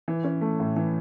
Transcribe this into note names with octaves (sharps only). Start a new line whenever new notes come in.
E3
C#4
A3
A2
E3